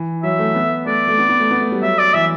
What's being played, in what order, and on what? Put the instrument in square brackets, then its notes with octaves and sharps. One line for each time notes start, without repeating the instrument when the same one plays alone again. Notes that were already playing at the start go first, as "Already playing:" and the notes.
Already playing: [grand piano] E3
[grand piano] F#3 [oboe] E5
[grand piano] A3
B3
[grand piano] A3 [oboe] D5
[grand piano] A3
B3
B3
A3
B3
A3
G3
[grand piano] F#3 [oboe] E5
[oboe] D5
[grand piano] E3 [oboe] E5